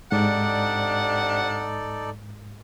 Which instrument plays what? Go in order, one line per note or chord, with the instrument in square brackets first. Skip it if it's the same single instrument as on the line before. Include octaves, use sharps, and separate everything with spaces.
[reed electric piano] G#2 [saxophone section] C3 D4 F#5 [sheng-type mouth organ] D#4 A4 D5